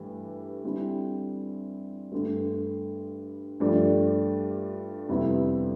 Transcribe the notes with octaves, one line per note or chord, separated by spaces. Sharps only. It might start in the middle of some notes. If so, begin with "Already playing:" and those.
Already playing: G2 E3 A3 G4
D3 G3 C4 E4
G2 D3 A3
G2 F3 A3 D4 G4
F2 C3 G3 B3 E4